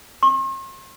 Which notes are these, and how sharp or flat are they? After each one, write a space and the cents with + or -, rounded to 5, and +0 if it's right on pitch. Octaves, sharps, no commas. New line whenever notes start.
C6 +45